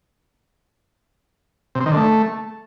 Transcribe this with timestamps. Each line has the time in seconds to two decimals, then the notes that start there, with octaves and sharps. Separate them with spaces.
1.75 C3
1.81 C4
1.86 D#3
1.91 D3
1.97 A3